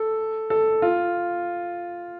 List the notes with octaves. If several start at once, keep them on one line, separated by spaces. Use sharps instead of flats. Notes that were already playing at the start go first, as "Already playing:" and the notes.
Already playing: A4
A4
F4